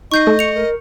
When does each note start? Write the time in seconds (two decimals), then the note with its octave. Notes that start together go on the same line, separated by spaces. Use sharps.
0.12 D#4 D#5 C#6 G6 C7
0.27 A3
0.39 C#6 C#7 F7
0.56 A#4